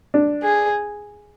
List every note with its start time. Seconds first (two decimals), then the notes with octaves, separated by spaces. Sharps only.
0.14 D4
0.43 G#4